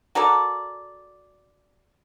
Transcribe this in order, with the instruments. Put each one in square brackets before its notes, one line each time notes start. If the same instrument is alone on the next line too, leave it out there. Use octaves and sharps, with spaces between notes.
[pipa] F#4 A4 A#4 D5